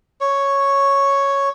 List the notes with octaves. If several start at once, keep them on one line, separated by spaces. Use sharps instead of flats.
C#5